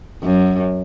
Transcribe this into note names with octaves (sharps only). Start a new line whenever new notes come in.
F#2